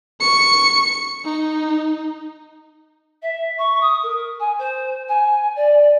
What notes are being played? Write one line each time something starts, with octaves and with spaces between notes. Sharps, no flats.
C#6 C#7
D#4
E5
C#6
D#6
A#4
G#5
C5
G#5
D5